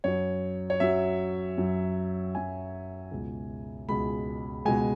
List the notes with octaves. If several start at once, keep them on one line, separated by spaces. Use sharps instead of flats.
F#2 F#3 C#5
C#5
F#2 F#3 E5
F#2 F#3
F#2 F#3 G#5
C#2 B2 G#3
C#2 B2 G#3 B5
C#2 B2 G#3 G#5